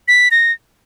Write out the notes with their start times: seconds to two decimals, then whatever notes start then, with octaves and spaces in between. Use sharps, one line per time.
0.08 B6
0.31 A#6